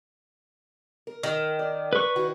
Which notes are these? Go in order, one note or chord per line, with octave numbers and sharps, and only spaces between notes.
A#4
D#3
D5
B4 C#6
D#3 E4 F#4